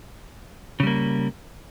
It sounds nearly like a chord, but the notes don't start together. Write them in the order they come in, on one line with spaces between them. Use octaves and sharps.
C#3 G3 A#3